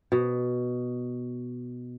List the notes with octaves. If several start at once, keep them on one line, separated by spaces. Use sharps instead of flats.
B2